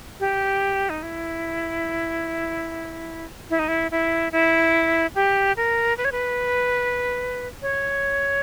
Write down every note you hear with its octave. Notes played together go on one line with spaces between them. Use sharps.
G4
D#4
E4
E4
D#4
E4
E4
E4
G4
A#4
B4
C#5
B4
C#5